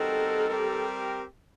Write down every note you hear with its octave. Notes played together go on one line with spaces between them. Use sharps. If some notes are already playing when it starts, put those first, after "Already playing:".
Already playing: G3 C4 D#4 F#4 A4 A#4
G3 C4 G4 A#4